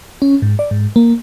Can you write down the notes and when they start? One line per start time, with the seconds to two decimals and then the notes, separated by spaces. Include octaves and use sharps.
0.22 C#4
0.42 G#2
0.59 D5
0.71 G#2
0.96 A#3